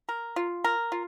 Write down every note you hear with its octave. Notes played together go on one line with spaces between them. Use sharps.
A#4
F4
A#4
F4